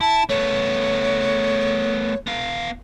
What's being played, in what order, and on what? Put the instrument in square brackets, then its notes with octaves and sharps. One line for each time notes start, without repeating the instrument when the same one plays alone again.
[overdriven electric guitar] E4 [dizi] A5
[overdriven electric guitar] A3 B3 [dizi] C#5
[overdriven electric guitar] B3 F5